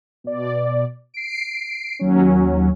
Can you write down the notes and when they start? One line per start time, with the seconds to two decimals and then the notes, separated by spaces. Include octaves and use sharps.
0.24 B2 D5
1.14 C7 D7
1.99 D#2 F#3 C#4